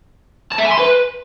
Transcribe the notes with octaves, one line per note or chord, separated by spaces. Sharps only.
A5
E5
G#5
C6
B4